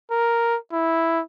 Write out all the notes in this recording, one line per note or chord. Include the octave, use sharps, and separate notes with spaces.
A#4
E4